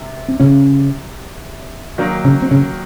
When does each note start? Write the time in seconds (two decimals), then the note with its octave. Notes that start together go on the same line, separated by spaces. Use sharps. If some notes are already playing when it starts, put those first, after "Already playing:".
Already playing: C3
0.28 C4
0.40 C#3 C#4
1.98 D#3 F#3 A#3
2.24 C#3 C#4
2.42 C4
2.51 C#3 C#4